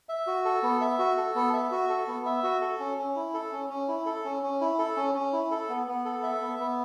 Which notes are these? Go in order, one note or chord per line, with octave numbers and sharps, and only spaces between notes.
E5
F#4
A4
B3
E5
F#4
A4
B3
E5
F#4
A4
B3
E5
F#4
A4
C#4
C#4
E4
A4
C#4
C#4
E4
A4
C#4
C#4
E4
A4
C#4
C#4
E4
A4
B3
B3
A4
E5
B3
B3